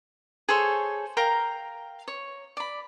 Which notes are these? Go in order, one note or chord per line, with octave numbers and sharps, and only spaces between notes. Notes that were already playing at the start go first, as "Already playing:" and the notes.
G#4 A4 C5 C#5
A#4 F5 G5 A#5
C#5
D5 B5